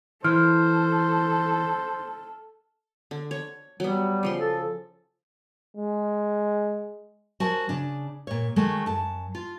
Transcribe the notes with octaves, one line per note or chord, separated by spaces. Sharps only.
E3 A4 C5 F6
D3
C#5
F#3 G3 B3
C#3 F3 C6
A4
G#3
F#3 F#4 A#4 C5 G#5 A5
C#3 D4
A#2 C#5
D#3 F#3 G#3 A3
F#2 A5
F4